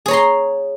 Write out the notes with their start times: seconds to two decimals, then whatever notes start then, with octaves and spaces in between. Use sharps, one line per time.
0.06 G#4
0.08 C#5
0.11 A#5
0.13 C6